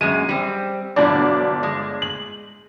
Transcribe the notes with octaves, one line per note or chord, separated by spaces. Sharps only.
F#2 A#2 G#3 D#7
G3 C4
G1 G#2 B2 F#3 D4 D5
G#3
F#7